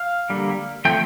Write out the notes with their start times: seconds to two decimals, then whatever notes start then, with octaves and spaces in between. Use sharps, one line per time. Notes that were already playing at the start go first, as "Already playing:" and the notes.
Already playing: F5
0.30 D3 G3 A#3
0.85 F3 A3 C4 G5